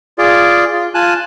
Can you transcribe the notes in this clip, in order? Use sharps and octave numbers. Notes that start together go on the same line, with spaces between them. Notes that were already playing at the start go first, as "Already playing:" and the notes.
F4 G#4 D5
F4
F4 G#5 A5 F#6